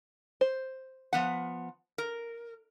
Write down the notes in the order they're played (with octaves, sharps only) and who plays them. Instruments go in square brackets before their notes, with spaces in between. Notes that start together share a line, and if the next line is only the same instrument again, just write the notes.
[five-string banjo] C5
[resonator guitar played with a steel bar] F3 B3 F#5
A#4